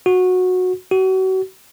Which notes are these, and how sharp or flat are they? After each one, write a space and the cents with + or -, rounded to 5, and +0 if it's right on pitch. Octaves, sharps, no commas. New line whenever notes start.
F#4 -15
F#4 +35